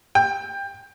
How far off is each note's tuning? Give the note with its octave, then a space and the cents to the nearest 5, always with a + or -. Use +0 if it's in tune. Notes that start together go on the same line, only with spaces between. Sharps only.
G5 +20